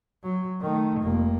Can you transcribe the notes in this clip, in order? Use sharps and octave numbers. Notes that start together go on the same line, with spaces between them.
F#3
D#3 A3
F1 A#3